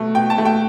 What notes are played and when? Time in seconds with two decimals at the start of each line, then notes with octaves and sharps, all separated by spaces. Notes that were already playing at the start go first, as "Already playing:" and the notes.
Already playing: B2 A3
0.14 B2 G5
0.30 A5
0.38 A3
0.45 G5